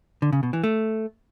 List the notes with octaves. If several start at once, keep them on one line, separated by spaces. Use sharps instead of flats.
D3
C#3
B2
E3
A3